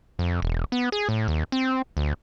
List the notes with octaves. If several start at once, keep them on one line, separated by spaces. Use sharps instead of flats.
F2
E1
B3
G#4
A2
D#2
C4
D2